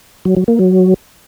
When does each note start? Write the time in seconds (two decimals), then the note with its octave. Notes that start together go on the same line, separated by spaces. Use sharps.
0.25 F#3
0.37 F#3
0.48 A#3
0.59 F#3